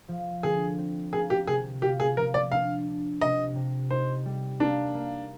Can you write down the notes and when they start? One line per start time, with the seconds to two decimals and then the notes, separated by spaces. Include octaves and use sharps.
0.08 F3
0.43 D3 G#4
0.78 C4
1.13 A#3 G#4
1.30 G4
1.47 C3 G#4
1.82 F4 G4
2.00 G#4
2.17 F3 A#4
2.34 D5
2.52 D4 F5
2.86 D4
3.21 C3 D#5
3.56 C3
3.91 D#4 C5
4.26 G3
4.60 A#3 D4
4.95 A#3